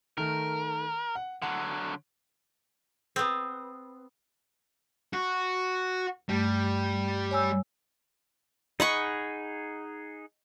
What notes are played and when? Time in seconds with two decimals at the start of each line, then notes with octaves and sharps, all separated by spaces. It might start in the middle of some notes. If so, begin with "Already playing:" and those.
0.18 D#3 A3 A#4
1.15 F#5
1.42 D3 F#3 F#5
3.16 B3 C4
5.13 F#4 F#6
6.29 G2 G3 A3
7.31 C#5 G#5 E6
8.80 D#4 G#4 D#5 F#5 B5 C#6